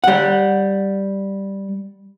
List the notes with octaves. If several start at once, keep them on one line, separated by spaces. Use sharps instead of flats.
G3 F#5